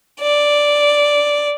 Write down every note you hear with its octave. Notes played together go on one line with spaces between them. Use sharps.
D5